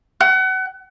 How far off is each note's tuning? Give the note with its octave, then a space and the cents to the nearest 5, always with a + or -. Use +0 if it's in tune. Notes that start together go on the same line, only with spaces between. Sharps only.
F#5 +30